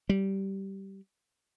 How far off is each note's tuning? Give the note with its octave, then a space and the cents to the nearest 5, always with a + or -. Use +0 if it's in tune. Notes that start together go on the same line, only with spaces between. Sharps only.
G3 -15